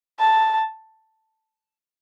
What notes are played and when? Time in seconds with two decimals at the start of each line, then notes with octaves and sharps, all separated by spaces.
0.20 A5